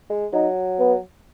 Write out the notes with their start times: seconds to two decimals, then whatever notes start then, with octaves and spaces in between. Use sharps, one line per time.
0.10 G#3
0.33 F#3 D#4
0.79 B3